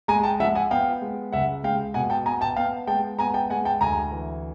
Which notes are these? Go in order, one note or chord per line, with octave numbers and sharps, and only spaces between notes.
G#3 G#5 A#5
G5 A5
F3 E5 F#5
F#5 G#5
B3 F5 G5
G#3
C#2 E5 F#5
G#3 F5 G5
B2 F#5 G#5
G5 A5
B3 G#5 A#5
G5 A5
B3 F5 G5
G#3 G5 A5
B3 G#5 A#5
G5 A5
G#3 F#5 G#5
G5 A5
D2 G#5 A#5
E3